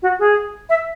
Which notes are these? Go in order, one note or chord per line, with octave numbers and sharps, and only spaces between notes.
F#4
G#4
E5